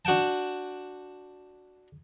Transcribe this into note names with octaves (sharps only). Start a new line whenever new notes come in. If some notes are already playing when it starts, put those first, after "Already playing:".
D4 F#4 F#5 G5 A5